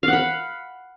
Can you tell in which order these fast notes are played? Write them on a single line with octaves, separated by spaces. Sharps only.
F5 F#5 B5